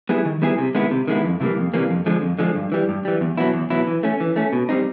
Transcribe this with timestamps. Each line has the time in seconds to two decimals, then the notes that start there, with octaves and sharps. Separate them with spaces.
0.09 G3 B3 E4 G#4
0.25 D#3
0.42 G3 B3 E4 G#4
0.58 C3
0.75 D#3 G#3 B3 E4
0.91 C3
1.08 D#3 G#3 B3 E4
1.24 F2
1.40 C3 E3 G3 A#3
1.57 F2
1.74 C3 E3 G3 A#3
1.90 F2
2.06 D3 F3 G#3
2.22 F2
2.39 D3 F3 G#3
2.55 G2
2.72 E3 G3
2.89 G2
3.05 E3 G3
3.21 E2
3.37 B2 F#3 B3 E4
3.54 E2
3.70 B2 F#3 B3 E4
3.87 E3
4.03 A3 C#4
4.20 E3
4.36 A3 C#4
4.53 B2
4.69 G3 C4 D#4